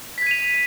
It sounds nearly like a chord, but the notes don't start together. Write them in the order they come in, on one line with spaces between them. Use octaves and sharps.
B6 G#6 D#7 F7